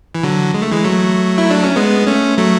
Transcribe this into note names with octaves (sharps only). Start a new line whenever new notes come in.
E3
D3 F#3
G#3
A3
E3 G#3
F#3 A3
E4
D4
C#4
G#3 B3
A3 C#4
F#3 A3